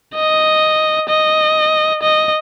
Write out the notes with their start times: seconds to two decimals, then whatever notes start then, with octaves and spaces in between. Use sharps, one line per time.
0.15 D#5
1.09 D#5
2.02 D#5